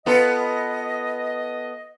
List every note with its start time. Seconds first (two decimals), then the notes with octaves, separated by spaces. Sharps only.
0.06 B3 F4 A4 D#5